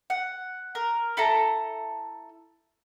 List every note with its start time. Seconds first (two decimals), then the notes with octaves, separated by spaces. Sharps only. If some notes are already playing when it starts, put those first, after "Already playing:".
0.10 F#5
0.75 A#4
1.17 E4 A4 A5 A#5